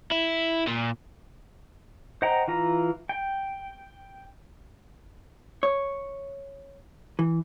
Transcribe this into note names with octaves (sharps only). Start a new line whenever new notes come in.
E4
A#2
C5 D#5 F#5 G5 A#5
E3 F4 A#5
G5
C#5
E3